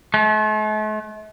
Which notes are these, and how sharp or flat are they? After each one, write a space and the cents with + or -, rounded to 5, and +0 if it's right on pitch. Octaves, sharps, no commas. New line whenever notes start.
A3 -45